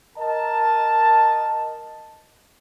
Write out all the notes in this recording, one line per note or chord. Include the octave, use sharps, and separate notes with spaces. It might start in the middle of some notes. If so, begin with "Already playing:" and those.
A#4 D#5 A5